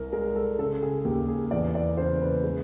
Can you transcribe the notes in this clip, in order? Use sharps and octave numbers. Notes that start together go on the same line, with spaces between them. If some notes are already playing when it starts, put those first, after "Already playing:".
Already playing: C2 A#4
G#3 A#4
A4
C#3 A4
G#4
D#2 G4
G#4
E2 D5
D5
C#3 C5
B4
G#3